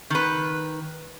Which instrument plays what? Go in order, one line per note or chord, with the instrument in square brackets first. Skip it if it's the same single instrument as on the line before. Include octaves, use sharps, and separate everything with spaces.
[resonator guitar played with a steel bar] D#3 B4